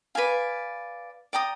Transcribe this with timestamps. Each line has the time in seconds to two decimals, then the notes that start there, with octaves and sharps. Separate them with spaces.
0.15 B4 D5 F5 G#5
1.33 D5 G5 A#5 D#6